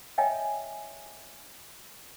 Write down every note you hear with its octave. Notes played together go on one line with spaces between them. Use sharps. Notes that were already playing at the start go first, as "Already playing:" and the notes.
C#5 D#5 E5 G5 G#5